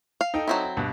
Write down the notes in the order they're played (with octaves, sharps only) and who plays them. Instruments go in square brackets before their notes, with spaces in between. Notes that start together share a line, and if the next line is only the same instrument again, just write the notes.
[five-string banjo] F5
[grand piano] D#4 A4 G5
[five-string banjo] F#3 C4 E4
[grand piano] G2 B2